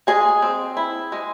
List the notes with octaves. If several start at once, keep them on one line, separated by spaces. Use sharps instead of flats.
G#3 G#4
C4
E4
G#3